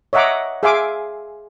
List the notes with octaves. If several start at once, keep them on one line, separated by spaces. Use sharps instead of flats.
C#5 D#5 E5 F#5 A#5 D6
G#4 E5 F5 G#5 C6 D6